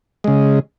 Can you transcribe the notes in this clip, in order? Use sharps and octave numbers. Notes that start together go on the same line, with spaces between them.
C#3 G#3